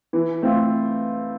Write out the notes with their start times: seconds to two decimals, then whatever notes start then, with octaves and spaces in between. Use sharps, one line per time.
0.13 E3
0.42 A3 C4 F4